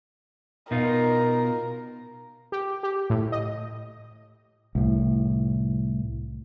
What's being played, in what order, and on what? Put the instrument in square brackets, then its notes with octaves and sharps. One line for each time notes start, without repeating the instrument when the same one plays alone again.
[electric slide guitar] B2 D#4 F4 [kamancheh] A#4
[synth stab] G4
G4
A2
D#5
[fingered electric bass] C2 A2